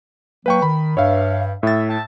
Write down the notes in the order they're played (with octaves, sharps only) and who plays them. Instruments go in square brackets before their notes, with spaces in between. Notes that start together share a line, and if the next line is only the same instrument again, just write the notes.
[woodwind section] F#3 A#3 [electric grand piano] B4 G5 C#6
[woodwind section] D#3 [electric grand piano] B5
[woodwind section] G2 [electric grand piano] C#5 E5 F5
[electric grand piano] A2 A6 [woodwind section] E5
[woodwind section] E5 G5 A5